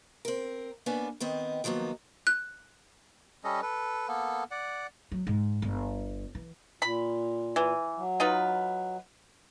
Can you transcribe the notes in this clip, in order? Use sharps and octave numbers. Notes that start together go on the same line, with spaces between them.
C4 A#4
A#3 B3 C#4 D4 B4
D#3 B3 C4 D#5
D#3 F3 F#3 A#3 B3
F#6
G3 C#4 A4 D#5
A4 B4
A#3 B3 A4
D5 F#5
F#3
G#2
G1
E3
A#2 B5
E3
F#3
D#4 F4 B4